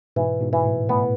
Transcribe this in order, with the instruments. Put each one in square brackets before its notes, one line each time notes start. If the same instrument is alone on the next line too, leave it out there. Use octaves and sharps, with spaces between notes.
[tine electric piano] G#2 B2 [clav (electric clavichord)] E3
[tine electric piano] G#2 B2
[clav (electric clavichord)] E3
[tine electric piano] A2
[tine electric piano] A2 [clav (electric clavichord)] B3